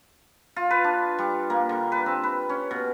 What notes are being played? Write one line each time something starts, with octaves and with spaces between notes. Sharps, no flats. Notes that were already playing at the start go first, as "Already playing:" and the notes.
F4
B4
D4
G3
A#3
D3
B4
C4
B4
C#4
B2